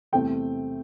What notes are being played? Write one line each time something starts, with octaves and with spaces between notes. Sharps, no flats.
E2 C3 A3 C4 G5